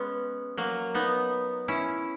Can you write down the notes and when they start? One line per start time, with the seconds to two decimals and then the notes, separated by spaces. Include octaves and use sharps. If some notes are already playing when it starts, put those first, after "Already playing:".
Already playing: G#3 B3 C#4
0.57 F#3 A#3
0.95 B3 D#4
1.68 C#4 E4